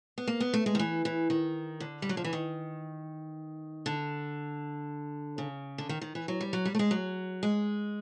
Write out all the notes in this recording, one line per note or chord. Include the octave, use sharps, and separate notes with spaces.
B3
A#3
B3
A3
G#3
D#3
E3
E3
D#3
D3
G3
F#3
F3
E3
D#3
D3
C#3
D3
D#3
D#3
E3
F#3
G3
F#3
G3
A3
G#3
F#3
G#3